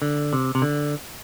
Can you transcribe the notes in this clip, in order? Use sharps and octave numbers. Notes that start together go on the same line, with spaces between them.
D3
C3
C3
D3